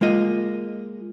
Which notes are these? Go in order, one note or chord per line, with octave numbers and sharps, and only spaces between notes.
G#3 A#3 F4 D#5